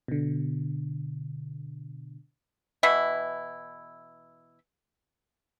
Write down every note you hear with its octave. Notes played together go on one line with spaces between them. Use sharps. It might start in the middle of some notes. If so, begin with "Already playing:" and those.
B2 D3
B2 E3 E4